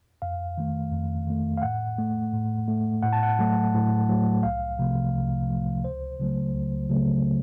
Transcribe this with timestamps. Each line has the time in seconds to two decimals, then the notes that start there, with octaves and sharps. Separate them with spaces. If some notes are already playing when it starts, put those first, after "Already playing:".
0.22 F2 F5
0.58 D#3 A3
0.92 F2
1.27 D#3 A3
1.58 F5
1.62 A2 F#5
1.98 A3
2.33 A2
2.68 A3
3.03 A2 F#5
3.13 A5
3.23 F#5
3.39 F#3 A3
3.74 A2
4.09 F#3 A3
4.43 C2 F5
4.79 C3 F3 A3
5.14 C2
5.49 C3 F3 A3
5.84 C#2 C5
6.20 C#3 F#3 A3
6.54 C#2
6.90 C#3 F#3 A3